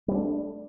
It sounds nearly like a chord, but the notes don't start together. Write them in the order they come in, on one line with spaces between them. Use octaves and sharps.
G3 C4 D4 A3